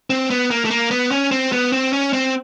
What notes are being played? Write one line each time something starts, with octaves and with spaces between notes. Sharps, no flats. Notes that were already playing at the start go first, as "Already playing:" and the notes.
C4
B3
A#3
A3
A#3
B3
C#4
C4
B3
C4
C#4
C4